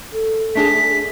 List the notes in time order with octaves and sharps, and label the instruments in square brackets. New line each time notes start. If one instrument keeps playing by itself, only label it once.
[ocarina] A4
[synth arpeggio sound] A3 D4 G#4 [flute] B6